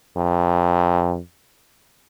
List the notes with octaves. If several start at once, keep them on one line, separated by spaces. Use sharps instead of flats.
F2